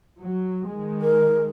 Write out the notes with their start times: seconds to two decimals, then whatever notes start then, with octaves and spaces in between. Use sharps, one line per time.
0.21 F#3
0.68 D#3 G#3
1.01 A#4